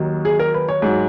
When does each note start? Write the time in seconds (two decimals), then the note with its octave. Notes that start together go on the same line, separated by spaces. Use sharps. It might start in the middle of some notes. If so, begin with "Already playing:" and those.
Already playing: D#2 D#3 F#3
0.25 G#4
0.39 A#4
0.54 B4
0.69 C#5
0.82 G#2 F#3